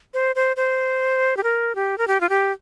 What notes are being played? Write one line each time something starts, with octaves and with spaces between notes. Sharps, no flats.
C5
C5
C5
G4
A#4
G4
A#4
G4
F4
G4